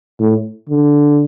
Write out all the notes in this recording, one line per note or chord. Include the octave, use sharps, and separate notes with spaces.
A2
D3